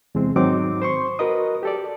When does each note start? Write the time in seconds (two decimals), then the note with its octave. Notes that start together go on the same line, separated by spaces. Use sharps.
0.15 E2 C3 G#3 C4
0.36 G#2 D#3 F#3 C4 D#4 D6
0.82 C5 C6 C#6
1.19 F#4 A#4 B4 D#5 D#6
1.63 G4 A4 D5